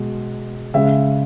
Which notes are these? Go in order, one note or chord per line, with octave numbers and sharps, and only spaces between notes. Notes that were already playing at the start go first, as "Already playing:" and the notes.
Already playing: B2 G#3
C#3 G#3 E5